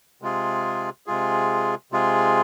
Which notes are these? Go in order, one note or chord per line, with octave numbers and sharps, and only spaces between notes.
C3 G#3 F4 G#4
C3 G#3 F4 G#4
C3 G#3 F4 G#4